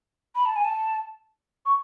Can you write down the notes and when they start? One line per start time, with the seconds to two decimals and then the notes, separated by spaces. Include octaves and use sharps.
0.35 B5
0.46 A5
0.56 G#5
0.65 A5
1.66 C#6